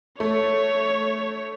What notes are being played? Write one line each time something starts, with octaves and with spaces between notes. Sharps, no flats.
A3 C#5